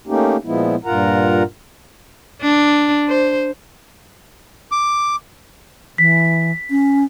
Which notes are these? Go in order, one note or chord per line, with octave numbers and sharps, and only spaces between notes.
A3 A#3 C#4 D#4 G4
A#2 F3 G#3 B3 E4
G2 A#2 F4 A#4 F#5 A#5
D4
C5
D6
E3 B6
C#4